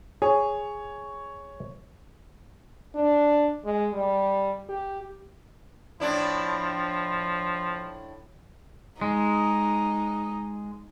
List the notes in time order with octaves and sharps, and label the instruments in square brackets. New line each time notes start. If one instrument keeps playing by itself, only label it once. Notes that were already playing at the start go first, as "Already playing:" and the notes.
[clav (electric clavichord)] G#4 [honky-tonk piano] C#5
[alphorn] D4
G#3
G3
G4
[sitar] A2 D4 E4 [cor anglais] F3
[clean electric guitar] G#3 [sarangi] D#4